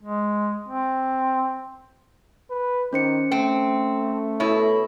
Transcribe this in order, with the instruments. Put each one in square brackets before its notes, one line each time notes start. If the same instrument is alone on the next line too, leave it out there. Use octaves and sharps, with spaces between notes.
[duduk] G#3
C4
[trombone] B4
[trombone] D#3 [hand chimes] C#4 C5 C#7
[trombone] A3 [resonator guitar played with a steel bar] C4
[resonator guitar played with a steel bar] B2 E4 [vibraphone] A4 C#5